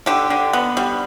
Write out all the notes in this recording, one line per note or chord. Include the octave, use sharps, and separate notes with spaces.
D3 G4
D3
B3
G3